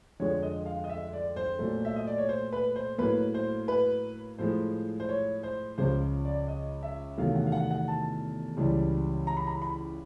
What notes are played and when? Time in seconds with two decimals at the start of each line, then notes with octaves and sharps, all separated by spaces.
0.20 F2 D3 F3 G#3 C#5
0.43 D#5
0.66 F5
0.84 D#5
0.89 E5
1.13 D5
1.36 C5
1.59 A#2 F#3 A3
1.85 E5
1.96 D#5
2.07 D5
2.18 C#5
2.29 C5
2.53 B4
2.76 C5
2.98 A2 F#3 A#3 B4
3.34 C5
3.68 B4
4.38 A2 F3 G#3 C5
5.00 C5
5.09 C#5
5.43 C5
5.78 C#2 C#3 F3 G#3 C5
6.25 D5
6.48 D#5
6.83 E5
7.18 E2 C3 D#3 F#3 A3 F5
7.36 F#5
7.47 F5
7.52 F#5
7.71 F#5
7.88 A5
8.57 C#2 C#3 E3 G3
9.27 A#5
9.37 B5
9.47 A#5
9.62 B5